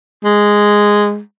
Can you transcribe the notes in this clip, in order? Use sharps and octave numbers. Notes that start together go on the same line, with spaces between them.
G#3